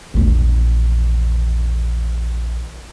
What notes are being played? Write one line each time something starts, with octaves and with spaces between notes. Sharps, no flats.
A#1 E2